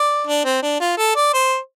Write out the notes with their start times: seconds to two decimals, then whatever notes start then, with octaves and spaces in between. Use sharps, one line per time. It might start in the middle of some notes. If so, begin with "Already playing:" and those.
Already playing: D5
0.27 D4
0.45 C4
0.62 D4
0.80 F4
0.97 A4
1.16 D5
1.34 C5